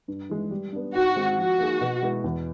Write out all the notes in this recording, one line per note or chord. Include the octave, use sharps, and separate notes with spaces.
G2
E3 G#3
G3
B3 D4
G#2 F#4
D#3 G#3 C4
F3 F#4
A#3 D#4 G#4
B2
G#3 B3 E4
E2